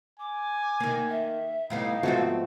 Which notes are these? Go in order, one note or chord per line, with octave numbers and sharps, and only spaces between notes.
G#5 D6
D#3 A#3
E5
A2 G3 B3 D#4 F5
G#2 F3 A3 B3 C4 F#4